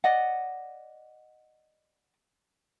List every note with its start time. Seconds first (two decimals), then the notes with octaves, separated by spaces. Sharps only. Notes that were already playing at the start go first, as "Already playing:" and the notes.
0.04 D5 D#5 F#5